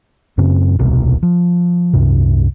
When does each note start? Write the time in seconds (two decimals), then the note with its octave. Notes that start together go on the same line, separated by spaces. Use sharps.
0.38 F#2 C#3 C4
0.79 D#1 C2 B2
1.23 F3
1.93 C2 F#2 C3